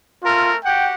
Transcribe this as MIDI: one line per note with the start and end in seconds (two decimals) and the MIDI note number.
0.23 0.54 57
0.23 0.54 60
0.23 0.51 65
0.23 0.54 70
0.65 0.94 66
0.65 0.94 67
0.65 0.94 78
0.65 0.87 79